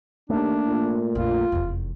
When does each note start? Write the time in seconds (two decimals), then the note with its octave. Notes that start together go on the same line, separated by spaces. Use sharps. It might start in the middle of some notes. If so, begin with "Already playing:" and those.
0.30 D#2 A3 A#3 D4
0.68 A#2
1.15 A#1 F2 F4
1.52 F1 E2